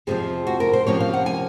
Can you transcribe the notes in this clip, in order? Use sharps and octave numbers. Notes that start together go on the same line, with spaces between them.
F2 C3 F3 G#4
F#4
A#4
C5
C3 F3 A#3 C#4 C#5
F5
F#5
G#5